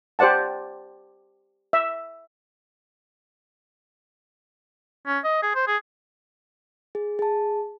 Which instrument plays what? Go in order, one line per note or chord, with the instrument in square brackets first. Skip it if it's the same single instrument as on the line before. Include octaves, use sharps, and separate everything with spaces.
[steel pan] G4 C5 D5 F#5 A5
E5
[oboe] C#4
D#5
G#4
C5
G#4
[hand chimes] G#4
G#4 A5